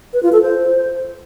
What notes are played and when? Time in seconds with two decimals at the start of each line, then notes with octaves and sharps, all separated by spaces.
0.13 B4
0.23 F4
0.32 A4
0.42 C5